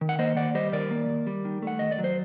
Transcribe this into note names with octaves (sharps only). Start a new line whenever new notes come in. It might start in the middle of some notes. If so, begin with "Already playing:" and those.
D#3
F#5
A#3 C5 D#5
D#2 D5 F#5
G3 C5 D#5
D#3 A#4 D5
A#3
D#2
G3
D#3
A3 F#5
D#2 D#5
D5
F#3
C5